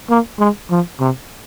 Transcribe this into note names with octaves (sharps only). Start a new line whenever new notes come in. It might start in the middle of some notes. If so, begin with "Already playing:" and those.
A#3
G#3
F3
C3